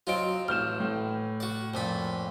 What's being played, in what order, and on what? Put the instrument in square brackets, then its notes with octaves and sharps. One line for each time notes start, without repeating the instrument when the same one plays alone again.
[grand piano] F#3 D#5 D7 [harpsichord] C4 F4
[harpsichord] A1 [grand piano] F6 G6 E7
[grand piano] A2
[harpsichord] F#4 D5
F2 A#2 B5